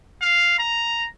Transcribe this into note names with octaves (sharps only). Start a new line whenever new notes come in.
F5
A#5